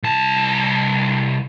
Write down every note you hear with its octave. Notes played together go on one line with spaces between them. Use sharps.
C2 A5